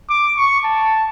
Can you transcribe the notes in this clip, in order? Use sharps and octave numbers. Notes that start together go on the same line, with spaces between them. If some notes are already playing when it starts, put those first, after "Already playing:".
D6
C#6
A5